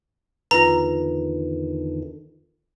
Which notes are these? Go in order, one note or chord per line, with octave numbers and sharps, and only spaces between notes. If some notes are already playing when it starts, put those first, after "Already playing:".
E2 D3 D#3 F4 B4 A#5